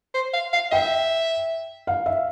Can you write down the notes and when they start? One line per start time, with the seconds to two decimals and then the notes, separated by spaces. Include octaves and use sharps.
0.14 C5
0.34 F5
0.53 F5
0.72 E5 G5
1.87 F5
2.06 E5